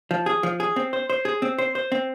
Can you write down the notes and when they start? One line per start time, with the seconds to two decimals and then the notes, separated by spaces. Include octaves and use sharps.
0.11 F3
0.26 G#4
0.43 F3
0.60 G#4
0.76 C4
0.93 C5
1.10 C5
1.25 G#4
1.42 C4
1.58 C5
1.75 C5
1.92 C4